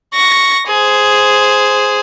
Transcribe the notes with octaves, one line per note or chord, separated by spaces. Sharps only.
C#6 A#6
G#4 C5